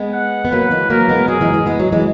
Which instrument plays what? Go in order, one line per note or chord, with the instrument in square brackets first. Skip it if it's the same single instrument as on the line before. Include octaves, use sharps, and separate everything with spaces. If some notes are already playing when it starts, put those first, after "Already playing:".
Already playing: [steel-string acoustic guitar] G#3 B3
[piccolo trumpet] F#5
[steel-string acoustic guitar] B3
[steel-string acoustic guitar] F#3 A#3 [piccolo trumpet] B4
[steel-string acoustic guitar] E3 G#3
[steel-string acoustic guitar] F#3 A#3 [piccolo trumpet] A#4
[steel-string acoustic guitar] G#3 B3
[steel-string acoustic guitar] F#3 [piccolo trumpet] G#4
[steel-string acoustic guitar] E3 G#3
E3 G#3
G#3 B3
F#3
E3 G#3